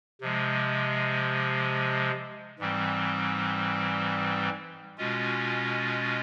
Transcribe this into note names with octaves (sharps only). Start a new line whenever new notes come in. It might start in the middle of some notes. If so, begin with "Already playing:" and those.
C3 F3 G#3
G#2 E3 G3 C4
B2 G#3 C#4 F4